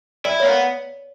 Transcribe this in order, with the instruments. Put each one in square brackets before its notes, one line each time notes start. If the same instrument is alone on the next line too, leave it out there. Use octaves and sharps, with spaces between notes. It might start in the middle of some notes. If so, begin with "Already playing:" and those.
[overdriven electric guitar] E4 [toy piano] D5
[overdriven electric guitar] A#3 [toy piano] C#5
[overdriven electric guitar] B3